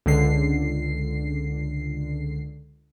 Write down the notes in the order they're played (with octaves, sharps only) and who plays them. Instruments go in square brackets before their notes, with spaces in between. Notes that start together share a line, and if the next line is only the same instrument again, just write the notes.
[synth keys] C#2 D3 C7